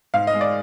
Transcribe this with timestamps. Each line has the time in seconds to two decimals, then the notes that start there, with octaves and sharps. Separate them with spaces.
0.14 G#2 F5
0.27 D#5
0.34 G#3
0.41 D5